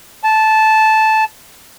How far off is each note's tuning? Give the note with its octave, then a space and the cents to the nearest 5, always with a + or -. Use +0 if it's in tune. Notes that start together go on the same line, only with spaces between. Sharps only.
A5 -10